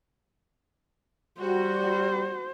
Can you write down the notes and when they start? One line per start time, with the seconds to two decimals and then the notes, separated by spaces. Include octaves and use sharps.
1.41 G3 F#4 C5